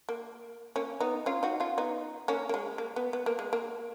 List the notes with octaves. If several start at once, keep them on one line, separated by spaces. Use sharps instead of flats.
A#3
A#3 C#4
B3 D#4
C#4 F4
D#4 F#4
C#4 F4
B3 D#4
A#3 C#4
A#3
G#3
A#3
B3
B3
A#3
G#3
A#3